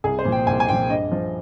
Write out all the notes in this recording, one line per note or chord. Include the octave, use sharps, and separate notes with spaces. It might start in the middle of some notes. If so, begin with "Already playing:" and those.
C2 G#4
C5
A#2 F3
G5
C2 G#5
G#5
A#2 F3 G5
G2 D#5
F3